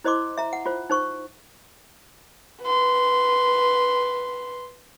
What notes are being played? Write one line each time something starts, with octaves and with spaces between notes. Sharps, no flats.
E4 C5 D#5 C6 D6
E5 A#5
F#5
F4 C5
D#4 C5 C#6
B4 C6